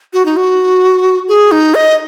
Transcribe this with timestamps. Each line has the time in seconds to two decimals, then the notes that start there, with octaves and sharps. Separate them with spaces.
0.13 F#4
0.25 D#4
0.37 F#4
1.28 G#4
1.52 D#4
1.75 D#5